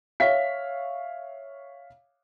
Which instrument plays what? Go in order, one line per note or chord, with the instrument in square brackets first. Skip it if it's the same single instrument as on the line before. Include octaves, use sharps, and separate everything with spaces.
[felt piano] C#5 E5 F5 B6